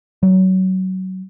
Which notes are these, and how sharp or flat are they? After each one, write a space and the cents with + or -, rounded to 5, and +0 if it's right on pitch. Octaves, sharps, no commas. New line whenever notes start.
F#3 +20